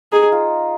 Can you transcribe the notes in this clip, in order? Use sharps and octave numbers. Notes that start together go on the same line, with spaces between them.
D#4 G#4
F4